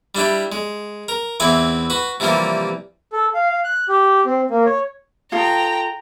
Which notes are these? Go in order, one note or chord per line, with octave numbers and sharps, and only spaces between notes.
G3 D4 E4 G4
G#3
A#4
E2 E3 C4 E4 G#5 D6
F#4 B4
C3 E3 F3 G3 A#3
A4
F5
F5
F#6
G4
C4
A#3
C#5
F4 A4 G5 A#5 D#6